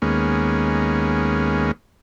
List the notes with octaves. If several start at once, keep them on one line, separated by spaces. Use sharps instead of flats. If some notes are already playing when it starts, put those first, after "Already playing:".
D#2 G#3 A#3 B3 C#4